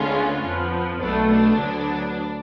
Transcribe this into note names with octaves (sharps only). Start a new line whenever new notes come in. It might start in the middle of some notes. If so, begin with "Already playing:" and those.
Already playing: D2 D3 G#3 B3 C#4 F4
F2 F3 B3
B1 B2 A3 B3 D4
B3 D4
D2 D3 F#3 B3